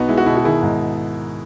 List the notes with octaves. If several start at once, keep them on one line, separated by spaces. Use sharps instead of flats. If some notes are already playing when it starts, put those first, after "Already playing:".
Already playing: B1 B3 D#4 F#4
G#3 E4
F#4
B2 E4
F#4
D#3 E4 G#4
G#2